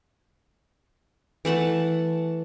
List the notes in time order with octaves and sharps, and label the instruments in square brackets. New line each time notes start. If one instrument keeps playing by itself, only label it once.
[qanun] E3 A3 F#5 A5